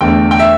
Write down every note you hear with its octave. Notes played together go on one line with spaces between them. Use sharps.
E2 D3 A3 G5
G5
E5